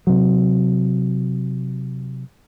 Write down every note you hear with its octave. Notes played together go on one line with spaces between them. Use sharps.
C3 F#3